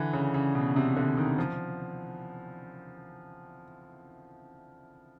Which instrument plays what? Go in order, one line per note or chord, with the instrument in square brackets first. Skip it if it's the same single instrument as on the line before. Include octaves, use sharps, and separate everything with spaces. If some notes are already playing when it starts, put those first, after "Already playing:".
Already playing: [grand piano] D3 E3
C#3
C#3
B2
C3
D3
D#3
F3